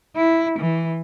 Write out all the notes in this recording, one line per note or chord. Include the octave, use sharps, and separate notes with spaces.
E4
E3